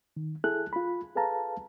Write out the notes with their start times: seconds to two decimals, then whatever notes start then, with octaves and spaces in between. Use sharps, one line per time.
0.17 D#3
0.44 E4 G#4 A4 F#6
0.73 F4 B5
1.15 G#4 A4 B4 F5 A5 A#5